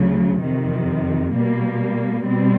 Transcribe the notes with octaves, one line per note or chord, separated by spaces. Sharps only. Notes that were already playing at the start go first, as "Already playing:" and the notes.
Already playing: D2 C#3 F#3
F2 C3 D#3
B2 G3 A#3
B2 G3 C4